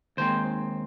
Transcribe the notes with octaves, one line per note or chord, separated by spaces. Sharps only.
D#2 D#3 G#3 C4 C5